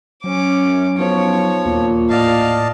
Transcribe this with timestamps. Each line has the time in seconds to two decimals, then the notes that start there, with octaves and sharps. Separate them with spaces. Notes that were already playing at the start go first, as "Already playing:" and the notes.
0.24 F#3 C#4 D6
0.62 F#2
0.98 B1 F3 C#5
1.65 D#2 A#2
2.10 A2 D5 D#5 F5 A5